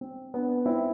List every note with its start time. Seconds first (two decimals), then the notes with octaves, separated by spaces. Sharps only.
0.01 C4
0.34 B3 D4
0.66 C4 E4